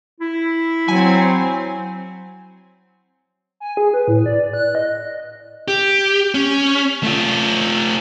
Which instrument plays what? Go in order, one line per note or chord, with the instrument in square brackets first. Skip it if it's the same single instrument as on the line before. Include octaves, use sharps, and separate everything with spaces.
[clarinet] E4
[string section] F#3 C4 [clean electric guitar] G#5
[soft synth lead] G#5
G#4
B4
A2
D5
F#6
D#5
[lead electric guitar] G4
C#4
A3 F4